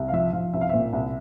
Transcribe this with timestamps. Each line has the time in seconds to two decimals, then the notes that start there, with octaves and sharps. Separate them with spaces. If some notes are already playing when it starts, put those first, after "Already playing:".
Already playing: C2
0.08 F5
0.13 F3 E5
0.33 F3 F5
0.53 C2 E5
0.61 F5
0.69 A#2 E5
0.93 C2